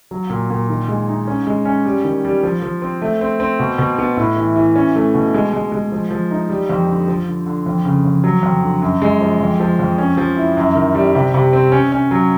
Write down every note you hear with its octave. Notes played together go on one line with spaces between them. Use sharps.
F#3
A#2
A#2
D#3
G#3
D#4
C#4
G#3
C#4
G3
D#3
G3
F3
F3
C4
A3
C4
C4
B2
B2
B3
A2
E3
E3
C#4
A3
B2
G#3
G#3
G#3
F3
F3
D#4
G3
F2
D3
F3
D3
D3
F2
C#3
F2
F#3
F2
D3
F#2
G#3
F3
F2
F3
F2
C#4
F3
E4
F#2
D#3
G3
C3
C3
C4
C#4
C#4
F#3